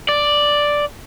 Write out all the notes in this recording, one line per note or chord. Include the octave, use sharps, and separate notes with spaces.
D5